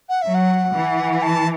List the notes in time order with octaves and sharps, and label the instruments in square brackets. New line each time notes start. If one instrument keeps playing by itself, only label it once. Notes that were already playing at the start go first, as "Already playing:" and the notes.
[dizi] F#5
[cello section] F#3 [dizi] E5
[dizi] F#5
[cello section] E3
[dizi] A5